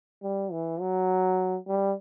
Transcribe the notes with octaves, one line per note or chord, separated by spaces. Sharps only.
G3
E3
F#3
G3